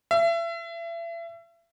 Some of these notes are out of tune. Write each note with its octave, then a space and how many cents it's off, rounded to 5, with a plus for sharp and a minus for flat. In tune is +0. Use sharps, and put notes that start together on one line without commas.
E5 +35